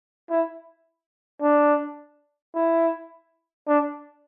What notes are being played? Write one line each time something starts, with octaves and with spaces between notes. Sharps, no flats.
E4
D4
E4
D4